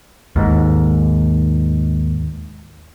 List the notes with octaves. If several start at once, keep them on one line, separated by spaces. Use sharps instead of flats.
D#2 G#2